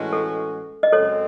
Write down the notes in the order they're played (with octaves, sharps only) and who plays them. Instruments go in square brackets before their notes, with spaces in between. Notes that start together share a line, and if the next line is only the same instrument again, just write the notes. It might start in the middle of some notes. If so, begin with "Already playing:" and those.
Already playing: [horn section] A2 E3 G#3 C#4 F#4
[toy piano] A4
D#5
[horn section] F#2 C#3 G#3 C4 [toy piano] A4 C#5